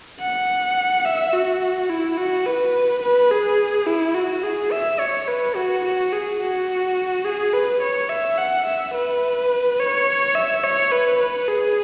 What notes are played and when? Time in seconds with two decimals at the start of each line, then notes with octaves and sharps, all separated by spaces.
0.21 F#5
1.05 E5
1.33 F#4
1.89 E4
2.18 F#4
2.46 B4
3.02 B4
3.31 G#4
3.87 E4
4.15 F#4
4.43 G#4
4.72 E5
5.00 C#5
5.28 B4
5.56 F#4
5.84 F#4
6.12 G#4
6.40 F#4
7.25 G#4
7.53 B4
7.82 C#5
8.10 E5
8.38 F#5
8.66 E5
8.94 B4
9.79 C#5
10.35 E5
10.64 C#5
10.92 B4
11.20 B4
11.48 G#4